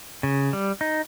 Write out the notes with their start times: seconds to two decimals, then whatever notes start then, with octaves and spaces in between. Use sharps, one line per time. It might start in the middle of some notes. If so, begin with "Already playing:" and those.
0.23 C#3
0.53 G3
0.81 D#4